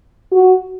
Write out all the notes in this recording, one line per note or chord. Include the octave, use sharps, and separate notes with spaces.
F#4